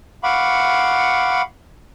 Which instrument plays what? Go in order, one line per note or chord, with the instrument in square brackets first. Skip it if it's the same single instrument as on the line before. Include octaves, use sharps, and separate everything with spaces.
[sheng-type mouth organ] F5 F#5 B5 C#6 D6